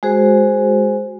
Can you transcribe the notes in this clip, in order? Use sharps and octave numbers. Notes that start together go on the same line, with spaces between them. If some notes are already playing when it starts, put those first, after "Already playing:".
G#3 F#4 G#4 C5